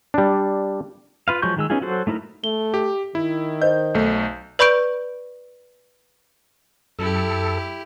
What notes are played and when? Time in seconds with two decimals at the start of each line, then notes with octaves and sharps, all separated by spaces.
0.14 G3 D4
1.28 F4 B4 F5
1.42 F3 F#3 G#3 C#6 G6
1.57 D#3 G#3 E6
1.70 B3 C#4 D#4 F4 G#4
1.82 F#3 F#4 A4 C5
2.07 A3 D#4 E4 A4 A#4
2.44 A3 G7
2.74 G4
3.15 D#3 E4
3.62 C5 D#5 G6
3.95 B1 A3
4.59 B4 D5 B5 C#6 G6 D7
6.99 F#2 F#3 E4 G4 A4